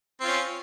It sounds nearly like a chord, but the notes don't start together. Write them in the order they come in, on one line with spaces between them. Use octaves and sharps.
C4 F4 C#4